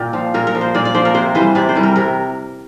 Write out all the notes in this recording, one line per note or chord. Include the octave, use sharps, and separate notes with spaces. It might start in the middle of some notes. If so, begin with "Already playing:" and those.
Already playing: A#2 G4
F3
A#2 A#4
A#4
F3
C5
A#2 D5
D5
F3 C5
A#4
C3 C5
E3 G3 C5
C3 D5
C5
E3 G3
A#4
C3 A#4